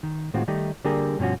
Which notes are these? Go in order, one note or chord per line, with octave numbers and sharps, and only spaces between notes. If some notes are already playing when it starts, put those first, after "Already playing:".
D#3
A2 D#3 G#3 C4 F4 F#4
D#3 G3 A3 D#4 G4
D3 G3 A#3 G4 G#4 A#4
G2 B2 F3 C#4 F#4